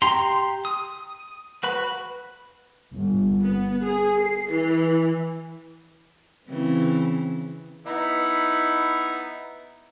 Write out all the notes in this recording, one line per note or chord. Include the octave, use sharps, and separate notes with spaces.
G4 A#5 C6
D#6
F#4 B4 B5
G1
B3
G#4
C7
E3
C#3 E3 C4
B3 D#4 E4